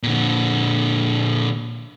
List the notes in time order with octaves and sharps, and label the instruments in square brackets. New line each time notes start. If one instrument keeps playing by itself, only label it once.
[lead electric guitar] A#2 D3